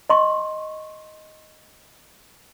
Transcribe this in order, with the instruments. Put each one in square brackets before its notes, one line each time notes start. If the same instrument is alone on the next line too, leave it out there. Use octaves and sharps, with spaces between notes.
[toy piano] D#5 C6 C#6